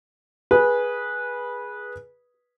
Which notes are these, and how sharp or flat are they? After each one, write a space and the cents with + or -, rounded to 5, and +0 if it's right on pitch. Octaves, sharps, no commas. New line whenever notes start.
G#4 +0 B4 -15